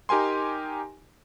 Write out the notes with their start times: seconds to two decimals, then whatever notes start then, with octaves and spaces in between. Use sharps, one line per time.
0.09 D#4 G4 A#4 G#5 C6